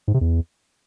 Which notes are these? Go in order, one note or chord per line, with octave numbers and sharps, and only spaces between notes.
G#2
C3
E2